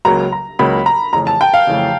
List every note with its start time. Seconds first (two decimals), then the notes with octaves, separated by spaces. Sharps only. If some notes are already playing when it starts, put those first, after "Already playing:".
0.05 C#2 C#3 F#3 A#3 A#5
0.32 A#5
0.59 C#2 C#3 F#3 A#3 B5
0.86 A#5
1.13 F2 C#3 E3 A3 A#5
1.27 A5
1.41 G5
1.54 F5
1.67 F2 C#3 E3 A3